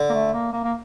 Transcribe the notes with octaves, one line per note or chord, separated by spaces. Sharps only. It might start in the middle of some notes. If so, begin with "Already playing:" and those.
Already playing: D3
A#3
A3
A#3
A#3
A#3